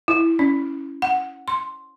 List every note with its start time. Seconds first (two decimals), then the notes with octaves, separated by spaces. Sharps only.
0.08 E4
0.39 C#4
1.02 F#5
1.48 C6